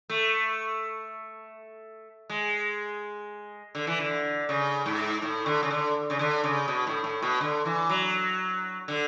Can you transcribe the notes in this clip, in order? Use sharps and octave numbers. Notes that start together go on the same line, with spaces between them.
A3
G#3
D3
E3
D3
C#3
G#2
A2
D3
C#3
D3
C#3
D3
C#3
B2
A2
A2
B2
D3
E3
F#3
D3